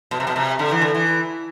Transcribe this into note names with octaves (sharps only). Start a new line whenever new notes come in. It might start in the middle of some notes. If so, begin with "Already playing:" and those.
B2
C3
B2
C3
D3
E3
D3
E3